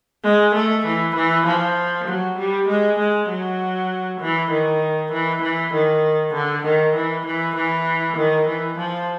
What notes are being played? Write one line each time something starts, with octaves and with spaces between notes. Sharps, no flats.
G#3
A3
E3
E3
F3
F#3
G3
G#3
G#3
F#3
E3
D#3
E3
E3
D#3
D3
D#3
E3
E3
E3
D#3
E3
F3